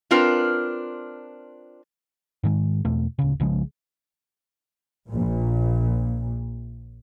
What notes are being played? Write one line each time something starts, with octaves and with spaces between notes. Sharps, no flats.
C4 D4 F4 A#4 B4
G#2 D#3 G#3
E2 B2 A3
D1 C#3
B1 C#3 F3 G#3
A#1 A#2